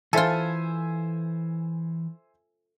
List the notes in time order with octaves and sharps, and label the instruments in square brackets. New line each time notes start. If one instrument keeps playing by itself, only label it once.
[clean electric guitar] E3 [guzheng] F4 A4 [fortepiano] C5 E5 G#5